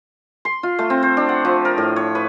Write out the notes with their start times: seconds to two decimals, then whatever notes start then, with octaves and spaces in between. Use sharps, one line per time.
0.45 C6
0.63 F4
0.79 A3
0.90 C4
1.03 C5
1.17 D4
1.29 F#5
1.45 F3
1.65 A#4
1.78 A2
1.96 C#5
2.15 B4